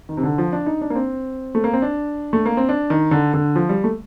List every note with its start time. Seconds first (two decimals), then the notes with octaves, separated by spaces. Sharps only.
0.09 D#3
0.17 C3
0.23 D3
0.38 F3
0.53 D4
0.66 D#4
0.81 D4
0.90 A#3
0.95 C4
1.55 A3
1.64 A#3
1.73 C4
1.82 D4
2.33 A3
2.46 A#3
2.57 C4
2.69 D4
2.90 D#3
3.11 D3
3.34 D3
3.55 F3
3.69 G3
3.84 A3